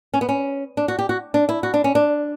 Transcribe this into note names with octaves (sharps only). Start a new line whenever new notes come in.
C#4
B3
C#4
D4
F#4
G4
F#4
D4
E4
F#4
D4
C#4
D4